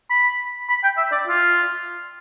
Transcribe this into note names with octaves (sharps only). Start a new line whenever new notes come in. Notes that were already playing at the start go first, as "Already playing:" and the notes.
B5
B5
G5
E5
D5
F4